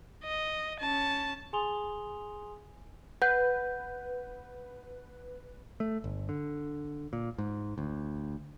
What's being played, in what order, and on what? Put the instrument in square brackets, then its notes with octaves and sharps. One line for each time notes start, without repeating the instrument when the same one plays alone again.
[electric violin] D#5
C#4 A5
[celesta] G#4 G#5 C6 D#6 F7 G7
[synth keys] B4 [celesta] F#5 G6
[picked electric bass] A3
G1
D3
A#2
G#2
D2